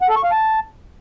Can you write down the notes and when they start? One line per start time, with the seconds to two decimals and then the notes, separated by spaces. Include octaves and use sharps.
0.01 F#5
0.09 A4
0.16 C#6
0.24 F5
0.31 A5